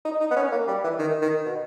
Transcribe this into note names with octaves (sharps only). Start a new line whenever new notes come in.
D#4
D#4
B3
C#4
A#3
G3
E3
D#3
D#3
B2